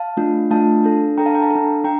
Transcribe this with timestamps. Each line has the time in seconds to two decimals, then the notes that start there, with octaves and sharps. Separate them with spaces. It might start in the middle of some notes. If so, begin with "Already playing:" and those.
Already playing: F5 A5
0.17 A3 D4 F4
0.51 A3 D4 F4 F5 A5
0.84 D4 A4
1.18 D4 A4 G5 A#5
1.26 F5 A5
1.34 G5 A#5
1.42 F5 A5
1.51 D4 A4
1.84 D4 G5 A#5